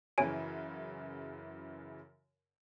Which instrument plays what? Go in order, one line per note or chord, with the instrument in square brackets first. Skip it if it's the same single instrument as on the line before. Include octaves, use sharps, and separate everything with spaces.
[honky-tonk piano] F#2 C#3 E3 [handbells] C#5 G#5 D7